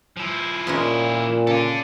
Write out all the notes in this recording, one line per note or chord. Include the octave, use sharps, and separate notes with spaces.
F3 E4
A#2 G#3 C#4 D#4
C#3 A4 D5